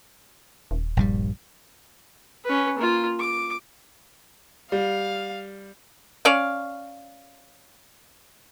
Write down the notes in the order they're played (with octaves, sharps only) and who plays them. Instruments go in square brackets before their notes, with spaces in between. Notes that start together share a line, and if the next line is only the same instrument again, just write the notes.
[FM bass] D#1
[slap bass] A#1 G2 G3
[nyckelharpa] C#4 B4
A#3 F4
D6
[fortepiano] G3 [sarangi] F5
[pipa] C#4 C#5 D5 F5